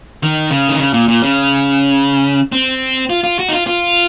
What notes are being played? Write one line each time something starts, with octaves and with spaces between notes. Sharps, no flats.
D#3
C#3
D#3
C#3
A#2
A#2
C#3
C4
F4
F4
F#4
D#4
F4
F4